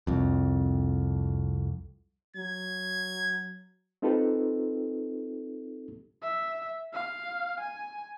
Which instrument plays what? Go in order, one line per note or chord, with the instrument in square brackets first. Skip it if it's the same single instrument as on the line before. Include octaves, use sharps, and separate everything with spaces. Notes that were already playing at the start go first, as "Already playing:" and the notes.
[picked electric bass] C2 F2
[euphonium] F#3 [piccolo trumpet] G#6
[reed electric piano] C4 D#4 F4 G4 A4 B4
[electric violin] E5
F5
G#5